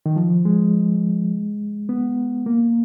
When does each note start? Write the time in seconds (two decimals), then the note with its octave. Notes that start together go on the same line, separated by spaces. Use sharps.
0.06 D#3
0.16 F3
0.45 G#3
1.89 B3
2.46 A#3